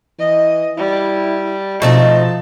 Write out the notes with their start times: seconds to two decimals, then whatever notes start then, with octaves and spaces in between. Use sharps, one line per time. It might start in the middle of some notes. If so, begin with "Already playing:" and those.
0.19 E3 D#5
0.78 G3 E4
1.82 B2 F3 A3 C4 D#4 A5